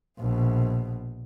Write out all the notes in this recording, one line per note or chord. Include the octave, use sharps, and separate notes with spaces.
A#1 B2